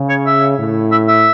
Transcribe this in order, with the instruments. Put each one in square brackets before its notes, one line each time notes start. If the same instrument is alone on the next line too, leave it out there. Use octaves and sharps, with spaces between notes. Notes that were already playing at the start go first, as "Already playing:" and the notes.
Already playing: [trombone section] C#3
[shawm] C#5
E5
[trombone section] A2
[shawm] E5
E5